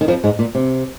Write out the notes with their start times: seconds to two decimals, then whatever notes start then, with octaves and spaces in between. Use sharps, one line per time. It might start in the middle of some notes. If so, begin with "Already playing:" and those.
0.01 D#3
0.08 F2 F3
0.24 G#2 G#3
0.39 A#2
0.55 C3